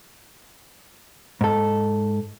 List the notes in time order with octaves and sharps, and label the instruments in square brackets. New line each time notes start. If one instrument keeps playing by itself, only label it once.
[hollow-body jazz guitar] G#2 A4